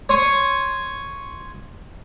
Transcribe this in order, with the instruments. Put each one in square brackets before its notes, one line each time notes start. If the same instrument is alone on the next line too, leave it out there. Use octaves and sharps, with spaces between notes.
[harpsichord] C#5 C6 C#6 D#6